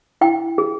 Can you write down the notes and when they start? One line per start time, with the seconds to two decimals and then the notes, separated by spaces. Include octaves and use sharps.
0.21 E4 G5
0.58 G#4